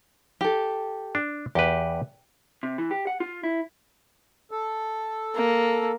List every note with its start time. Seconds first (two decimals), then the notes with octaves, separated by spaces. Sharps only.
0.41 G4 A4
1.15 D4
1.55 E2 G4 B4
2.63 C3
2.78 E3
2.91 G4
3.07 F#5
3.20 F4
3.44 E4
4.51 A4
5.35 A#3